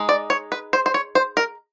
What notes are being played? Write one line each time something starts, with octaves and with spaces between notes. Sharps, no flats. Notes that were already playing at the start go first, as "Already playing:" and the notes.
Already playing: G#3 D#4
D5
C#5
B4
C5
C5
C#5
C5
A#4